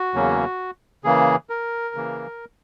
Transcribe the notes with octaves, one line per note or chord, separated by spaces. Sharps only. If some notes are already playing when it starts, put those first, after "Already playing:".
Already playing: F#4
E2 C#3 F#3 A#3 C#4
C#3 E3 A#3 G#4
A#4
C#3 E3 A#3